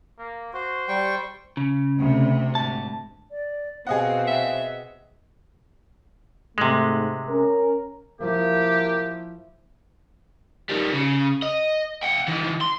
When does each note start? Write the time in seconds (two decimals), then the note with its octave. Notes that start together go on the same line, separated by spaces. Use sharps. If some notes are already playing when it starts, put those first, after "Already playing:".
0.19 A#3
0.53 F#4 C5
0.88 G3 G5 C#6
1.57 C#3
1.98 D2 C3
2.55 G#2 A5
3.31 D5
3.87 B2 C4 G#4 D#5 F5 F#5
4.27 E5
6.58 G#2 C3 G#3 A3
7.29 C#4 A#4
8.20 F3 A#3 E4 G4
10.70 D#3 G3
10.92 C#3
11.42 D#5
12.02 F#5 G5
12.28 D#3 E3
12.62 C6